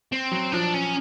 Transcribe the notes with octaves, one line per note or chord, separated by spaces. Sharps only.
C4
F#3
F3 D4
C#4